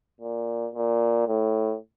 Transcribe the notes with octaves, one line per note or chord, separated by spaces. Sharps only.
A#2
A#2
A2